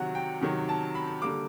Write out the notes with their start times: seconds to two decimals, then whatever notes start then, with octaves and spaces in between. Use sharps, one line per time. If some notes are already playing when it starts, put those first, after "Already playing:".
Already playing: C3 D#3 F#3 F#5
0.15 G5
0.41 C3 D#3 F#3
0.69 A5
0.95 B5
1.22 D3 G3 A#3 D6